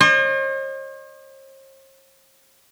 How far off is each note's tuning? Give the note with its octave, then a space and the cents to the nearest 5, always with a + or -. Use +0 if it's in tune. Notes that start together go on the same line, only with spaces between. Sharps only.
C5 +45 D#5 -40